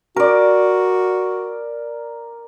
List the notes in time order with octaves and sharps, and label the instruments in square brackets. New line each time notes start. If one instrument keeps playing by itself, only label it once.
[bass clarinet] F#4 [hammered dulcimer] A#4 D5